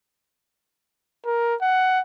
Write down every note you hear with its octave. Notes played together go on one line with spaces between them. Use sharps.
A#4
F#5